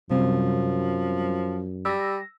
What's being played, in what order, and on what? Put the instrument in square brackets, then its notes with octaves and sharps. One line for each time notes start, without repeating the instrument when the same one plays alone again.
[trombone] F#2 [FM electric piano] C3 G3 C4 [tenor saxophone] F3
[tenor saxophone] G3 [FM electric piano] E6 A#6